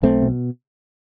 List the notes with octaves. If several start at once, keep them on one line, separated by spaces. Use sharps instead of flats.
B1 A3 C4
B2